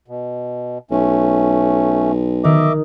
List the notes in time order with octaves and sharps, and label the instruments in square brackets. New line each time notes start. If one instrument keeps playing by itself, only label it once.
[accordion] B2
[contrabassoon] B1 [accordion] A3 C#4
[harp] D#3 [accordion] D#5 E5 D6